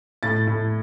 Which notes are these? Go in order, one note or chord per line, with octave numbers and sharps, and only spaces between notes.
A2 A6
A2